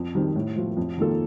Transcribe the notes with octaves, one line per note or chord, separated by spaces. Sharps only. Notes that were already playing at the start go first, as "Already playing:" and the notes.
Already playing: F2
D#3 G3 C4
A2
F3 A3
F2
D#3 A#3 F4 A4